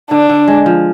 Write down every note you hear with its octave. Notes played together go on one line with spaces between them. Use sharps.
D3 D4
D3
G#3
F3